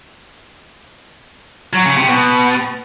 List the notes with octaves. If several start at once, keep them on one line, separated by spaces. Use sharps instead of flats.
F#3
C#3
C3
B2